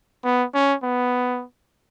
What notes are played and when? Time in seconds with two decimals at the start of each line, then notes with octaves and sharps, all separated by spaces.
0.25 B3
0.54 C#4
0.83 B3